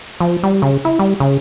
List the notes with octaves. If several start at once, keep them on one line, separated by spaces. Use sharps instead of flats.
F3
G3
C#3
E4
G3
C#3